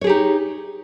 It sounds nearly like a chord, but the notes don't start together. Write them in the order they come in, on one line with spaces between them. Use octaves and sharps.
C#5 G#4 G4 D#4